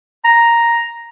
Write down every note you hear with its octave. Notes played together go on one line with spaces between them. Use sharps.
A#5